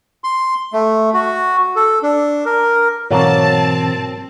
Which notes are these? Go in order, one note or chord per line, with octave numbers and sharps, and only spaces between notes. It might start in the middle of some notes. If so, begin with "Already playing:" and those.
C6
A3
F#4
A4
D4
A#4
G#2 B2 E3 F#3 A#3 C4 A5